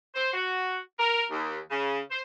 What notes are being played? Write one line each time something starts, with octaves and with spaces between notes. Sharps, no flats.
C5
F#4
A#4
D#2
C#3
C5